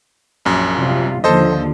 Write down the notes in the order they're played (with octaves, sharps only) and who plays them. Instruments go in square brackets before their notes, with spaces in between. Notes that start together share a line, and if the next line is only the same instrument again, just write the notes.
[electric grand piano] A#1 F#2
[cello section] C3 G3 F4
[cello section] D#2 D3 F3 [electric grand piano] A4 C5 D#5